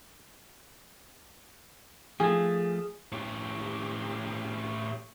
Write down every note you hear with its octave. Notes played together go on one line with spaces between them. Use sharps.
F3 A3 G#4
A2 G4